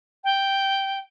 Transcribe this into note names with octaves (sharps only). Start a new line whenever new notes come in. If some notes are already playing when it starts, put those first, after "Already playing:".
G5